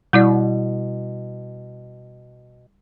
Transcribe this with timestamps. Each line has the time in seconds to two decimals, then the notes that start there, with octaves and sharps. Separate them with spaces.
0.13 B2 G3 E4 D5